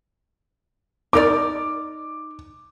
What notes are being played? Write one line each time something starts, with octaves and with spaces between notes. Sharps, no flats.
D#4 A#4 D5 D6